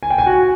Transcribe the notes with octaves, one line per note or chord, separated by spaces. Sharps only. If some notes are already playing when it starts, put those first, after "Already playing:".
G#5
G5
G#5
F#4